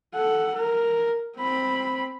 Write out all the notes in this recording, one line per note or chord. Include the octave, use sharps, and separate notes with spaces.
A4 F#5
A#4
C4 B5